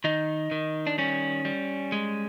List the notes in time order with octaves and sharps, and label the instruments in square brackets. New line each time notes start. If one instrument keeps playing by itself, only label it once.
[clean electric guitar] D#3 D#4
D#3
D4
G3 C#4
G3
G#3